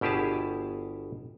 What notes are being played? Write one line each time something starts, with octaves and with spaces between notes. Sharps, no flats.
G1 B2 E4 G4 G#4 A5